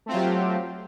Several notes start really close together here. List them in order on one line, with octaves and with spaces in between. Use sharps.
A3 C4 F4 F#3 G4